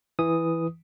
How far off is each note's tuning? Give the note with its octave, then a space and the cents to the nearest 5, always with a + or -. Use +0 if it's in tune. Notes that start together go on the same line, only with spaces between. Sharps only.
E3 +0 D#6 +0